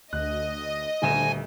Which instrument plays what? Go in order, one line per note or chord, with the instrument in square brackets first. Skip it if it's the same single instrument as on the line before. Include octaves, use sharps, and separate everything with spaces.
[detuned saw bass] D2 [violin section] D#5 [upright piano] F#6
[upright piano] D#1 D2 E7 [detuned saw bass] D3 [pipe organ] G#5